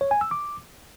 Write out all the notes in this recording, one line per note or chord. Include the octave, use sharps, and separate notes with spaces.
C#5
G#5
E6
D6